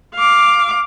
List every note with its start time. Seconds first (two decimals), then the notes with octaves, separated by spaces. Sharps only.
0.16 F5 D6